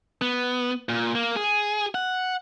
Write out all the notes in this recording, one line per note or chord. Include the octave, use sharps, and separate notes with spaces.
B3
A#2
A#3
G#4
F#5